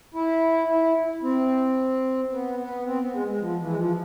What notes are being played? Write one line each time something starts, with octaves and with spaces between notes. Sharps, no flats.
E4
E4
C4
B3
B3
C4
B3
G#3
G#3
F3
E3
G#3
F3